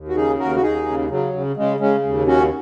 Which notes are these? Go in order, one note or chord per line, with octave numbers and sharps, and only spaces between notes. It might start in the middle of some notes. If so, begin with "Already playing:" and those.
Already playing: D#2
F#4
C#3 D#4 G#4
D#2 F#4 A#4
F#4
D#2 D#4 G#4
C#3
C#3 F#3
C#3
C#3 G#3
C#3 G#3 C#4
D#2
C#3 C#4 F#4